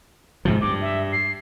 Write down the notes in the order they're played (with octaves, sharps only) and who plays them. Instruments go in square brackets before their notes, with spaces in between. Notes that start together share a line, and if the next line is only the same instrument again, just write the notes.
[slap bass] G#2 C3 F3
[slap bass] G2 [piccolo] D6
[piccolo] E5
C7